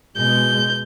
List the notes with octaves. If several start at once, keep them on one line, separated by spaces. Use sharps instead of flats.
B2 G#3 G6